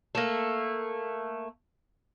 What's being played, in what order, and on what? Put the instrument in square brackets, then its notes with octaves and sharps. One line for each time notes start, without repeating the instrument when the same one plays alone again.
[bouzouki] A3 A#3